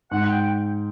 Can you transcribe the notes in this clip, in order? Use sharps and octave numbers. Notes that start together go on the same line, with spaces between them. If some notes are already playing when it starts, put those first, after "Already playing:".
G#2 F#5
G5